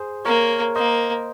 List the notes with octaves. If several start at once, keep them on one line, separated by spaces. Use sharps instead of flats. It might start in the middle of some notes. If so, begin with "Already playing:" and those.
Already playing: G#4 C5
A#3 A#4 C#5
A#3 C5 D#5